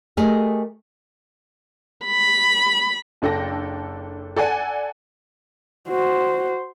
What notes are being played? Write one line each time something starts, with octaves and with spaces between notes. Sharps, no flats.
A3 G4 G#4 A#4 D#5
B5
F#1 D4 A4 G5 A#6
A4 D5 F#5 G#5
F#4 C5